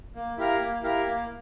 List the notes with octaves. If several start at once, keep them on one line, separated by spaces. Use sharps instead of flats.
A#3
E4 G4 A#4 F5
A#3
E4 G4 A#4 F5
A#3